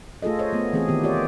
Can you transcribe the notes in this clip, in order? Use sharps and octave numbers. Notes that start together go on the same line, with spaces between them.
A3 F4 G#4 A4 D#5
C5 C#5 D#5
A3 B3
E3 A3 C4 G#4
D#3 B3 G4
F4 G4 C#5 D5